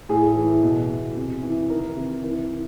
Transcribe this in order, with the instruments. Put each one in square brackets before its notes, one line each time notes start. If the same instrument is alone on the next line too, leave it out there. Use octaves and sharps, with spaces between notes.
[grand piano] A2 G#4
E3
B2
B2
C3
E3
D#3 A#4
C3
E3 A#4
E3